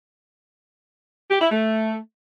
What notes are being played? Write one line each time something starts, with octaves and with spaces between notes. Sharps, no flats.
G4
E4
A3